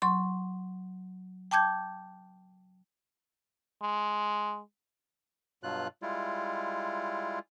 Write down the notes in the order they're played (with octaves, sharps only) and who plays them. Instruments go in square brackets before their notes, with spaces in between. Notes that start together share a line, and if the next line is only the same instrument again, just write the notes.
[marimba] F#3 C6 C#6
G5 A5 D6 G6 G#6
[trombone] G#3
[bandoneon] G2 B2 F#3 F4 F#6
G3 G#3 E4 F4